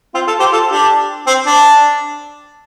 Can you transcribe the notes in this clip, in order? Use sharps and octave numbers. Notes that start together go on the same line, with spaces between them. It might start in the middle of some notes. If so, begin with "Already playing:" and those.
C4 F4
F4 A4
G4 C5
F4 A4
D4 G4
C4
D4